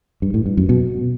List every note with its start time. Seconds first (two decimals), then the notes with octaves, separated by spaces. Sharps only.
0.22 G2
0.34 A2
0.46 G2
0.57 F#2
0.69 B2